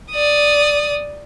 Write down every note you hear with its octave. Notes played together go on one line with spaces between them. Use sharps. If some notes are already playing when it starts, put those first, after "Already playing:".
D5 D#6